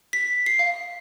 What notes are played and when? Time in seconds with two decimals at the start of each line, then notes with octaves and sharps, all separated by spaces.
0.13 B6
0.46 C7
0.59 F5